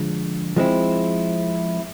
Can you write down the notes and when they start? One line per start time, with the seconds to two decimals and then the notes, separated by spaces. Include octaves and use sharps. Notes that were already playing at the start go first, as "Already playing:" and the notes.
Already playing: D3 F3 G#3
0.56 F3 G#3 C4 E4